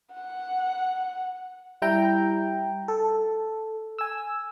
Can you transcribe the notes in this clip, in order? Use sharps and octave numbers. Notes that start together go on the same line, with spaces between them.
F#5
G3 E4 G5 A#5
A4
G#5 E6